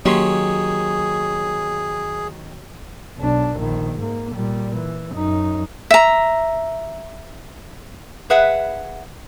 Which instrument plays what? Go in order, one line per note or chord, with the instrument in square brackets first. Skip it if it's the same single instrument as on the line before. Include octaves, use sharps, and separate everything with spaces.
[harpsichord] D#3 C#4 [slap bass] F#3 [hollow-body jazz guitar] A#3 G4 C6 [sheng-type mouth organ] G#4
[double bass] B1 D4
A#1 D#3
G#2 A#3
A#2 G3
E3
F#2 D#4
[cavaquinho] E5 A#5
[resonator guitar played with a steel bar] G#4 B4 E5 F#5